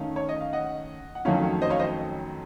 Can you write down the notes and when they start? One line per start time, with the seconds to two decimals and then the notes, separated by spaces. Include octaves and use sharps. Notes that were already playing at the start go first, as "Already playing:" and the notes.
Already playing: D#3 A3 C#4 F5
0.16 C#5
0.29 D#5
0.40 F5
0.53 D#5 F#5
1.15 F#5
1.25 F2 D#3 F#3 A3 C#4 C#5 F5
1.62 C5 D#5
1.70 C#5 F5
1.80 C5 D#5